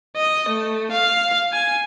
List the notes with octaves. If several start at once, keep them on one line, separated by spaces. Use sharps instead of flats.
D#5
A3
F5
G#5